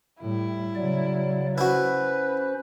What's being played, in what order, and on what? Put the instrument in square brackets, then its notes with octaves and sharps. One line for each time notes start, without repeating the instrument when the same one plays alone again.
[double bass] A2 G3 [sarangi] E4
[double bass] C#3 F#3 [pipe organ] D5
[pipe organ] C#4 C5 [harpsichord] E4 F#4 [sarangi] B4